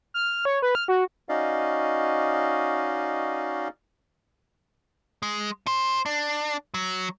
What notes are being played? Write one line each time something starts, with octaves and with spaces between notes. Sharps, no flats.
F6
C#5
B4
F6
F#4
C#4 D#4 F#4 D5 D#5 F5
G#3
D#4 C5
D4
F#3